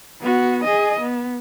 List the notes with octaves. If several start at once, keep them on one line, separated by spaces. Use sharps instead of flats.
B3 F#4
G#4 D#5
B3